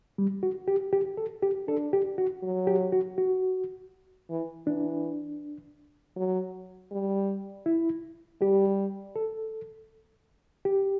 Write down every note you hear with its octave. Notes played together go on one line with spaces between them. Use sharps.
G3
F#4
G4
G4
A4
G4
D4 A4
G4
F#4
F#3
G4
F#4
F#4
E3
E3 D4
F#3
G3
E4
G3 G4
A4
G4